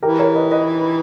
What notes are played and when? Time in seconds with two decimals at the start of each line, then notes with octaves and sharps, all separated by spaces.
0.03 E3 G4 A#4
0.19 A#4 C#5
0.35 B4 D#5
0.51 B4 D#5